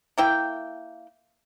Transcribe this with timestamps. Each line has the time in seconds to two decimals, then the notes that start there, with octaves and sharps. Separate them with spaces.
0.18 A#3 E4 G5